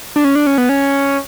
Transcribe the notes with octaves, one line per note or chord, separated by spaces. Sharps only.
D4
C#4
D4
C#4
B3
C#4